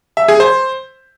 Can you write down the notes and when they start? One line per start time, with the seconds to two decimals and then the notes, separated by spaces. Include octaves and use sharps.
0.17 E5
0.28 G#4
0.40 C5